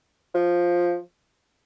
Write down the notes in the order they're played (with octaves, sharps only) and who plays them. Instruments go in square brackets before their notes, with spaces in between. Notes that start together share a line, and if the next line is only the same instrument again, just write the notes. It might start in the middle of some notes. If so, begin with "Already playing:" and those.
[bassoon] F3